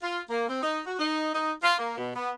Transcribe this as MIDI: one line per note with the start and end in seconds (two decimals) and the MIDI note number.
0.02 0.20 65
0.30 0.45 58
0.49 0.60 60
0.63 0.80 63
0.87 0.95 66
0.99 1.31 63
1.34 1.52 63
1.63 1.78 65
1.79 1.94 58
1.97 2.12 47
2.15 2.30 59